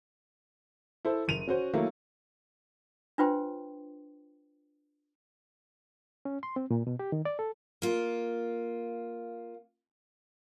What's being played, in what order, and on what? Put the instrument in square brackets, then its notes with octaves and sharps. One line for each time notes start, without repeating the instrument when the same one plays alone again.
[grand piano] E4 A4 C5
F#1 D#7 F7
C#4 F#4 C5
F#3 A3 A#3 E4
[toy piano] D4 F4 B4 C5 G5 C6
[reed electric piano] C#4
C6
C4
A#2
B2
G4
D#3
D5
A4
[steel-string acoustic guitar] A#3 F4